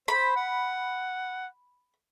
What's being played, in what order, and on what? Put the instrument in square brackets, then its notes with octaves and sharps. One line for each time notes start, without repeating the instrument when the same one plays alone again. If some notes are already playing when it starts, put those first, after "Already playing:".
[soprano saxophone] C5 [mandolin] B5
[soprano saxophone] F#5